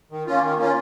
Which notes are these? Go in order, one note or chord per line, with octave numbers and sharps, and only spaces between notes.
D#3
A#3 C#4 F4
D#3
A#3 C#4 F4